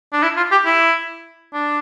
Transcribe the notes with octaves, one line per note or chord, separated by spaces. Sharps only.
D4
E4
F4
G4
E4
D4